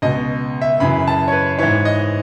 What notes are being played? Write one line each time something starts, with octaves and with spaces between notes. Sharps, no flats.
C#2 B2 D#5
E5
F#2 C#3 E3 B5
A5
C#5
B4
G#2 E3 C#5
D#5